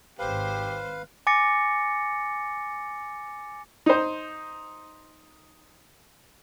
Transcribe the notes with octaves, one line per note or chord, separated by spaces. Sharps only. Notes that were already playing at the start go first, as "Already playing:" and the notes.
G#1 G4 B4 C5 F5
G#5 D6 A6 A#6 C#7
D#4 C5